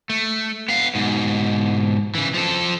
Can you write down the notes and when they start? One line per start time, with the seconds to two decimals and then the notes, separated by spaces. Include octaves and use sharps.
0.10 A3
0.68 B3 F5
0.95 G#2 B2
2.15 C#3 E3
2.34 F3 A4